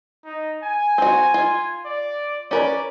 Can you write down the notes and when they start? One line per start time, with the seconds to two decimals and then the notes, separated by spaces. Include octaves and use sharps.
0.25 D#4
0.63 G#5
0.98 C4 F#4
1.34 F4
1.85 D5
2.51 C#4 A#4 B4 D5